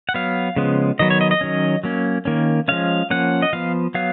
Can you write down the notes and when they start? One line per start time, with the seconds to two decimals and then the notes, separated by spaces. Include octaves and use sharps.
0.09 F#5
0.14 F#3 B3 F5
0.56 C#3 F3 G#3 B3
0.99 D#3 F#3 B3 D#5
1.10 C#5
1.21 D#5
1.31 D#5
1.41 D#3 F#3 C#4
1.84 F#3 A#3 C#4
2.25 D#3 A#3 C#4
2.68 F3 G#3 C#4 F5
3.10 F3 A#3 C#4 F#5
3.42 D#5
3.53 F3 B3 F5
3.94 F#3 B3 F5